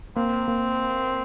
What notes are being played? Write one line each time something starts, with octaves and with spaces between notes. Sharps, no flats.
A#3 C4
A#3